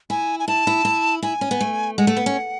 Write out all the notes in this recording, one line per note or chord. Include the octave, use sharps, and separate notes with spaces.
E4 G#5
G#5
E4 A5
E4
E4
E4 G#5
C#4
B3
A3
G#3 F#5
A3
B3
C#4